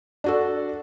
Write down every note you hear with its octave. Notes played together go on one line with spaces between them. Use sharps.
D4 F#4 A4